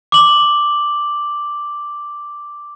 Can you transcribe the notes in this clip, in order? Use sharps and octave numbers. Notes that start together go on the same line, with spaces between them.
D6 F#7